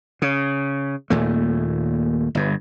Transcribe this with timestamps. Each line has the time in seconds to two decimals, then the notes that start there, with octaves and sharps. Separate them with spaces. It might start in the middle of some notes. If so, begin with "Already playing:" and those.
0.22 C#3
1.10 D#2 A#2 A3
2.35 G1 G2